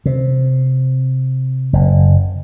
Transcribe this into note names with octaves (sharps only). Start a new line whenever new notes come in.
C3
F#1